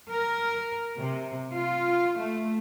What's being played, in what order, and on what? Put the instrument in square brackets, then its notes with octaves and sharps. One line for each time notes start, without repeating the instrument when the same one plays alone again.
[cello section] A#4
C3
F4
A3